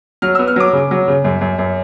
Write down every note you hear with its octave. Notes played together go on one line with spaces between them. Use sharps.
F#3 F6
B3 E6
F6
F#3 D6
C#3
F#3
C#3
F#2
F#2
F#2